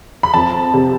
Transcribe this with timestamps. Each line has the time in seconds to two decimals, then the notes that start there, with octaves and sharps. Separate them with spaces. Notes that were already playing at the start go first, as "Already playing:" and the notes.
0.23 B5
0.34 F2 A5
0.74 C3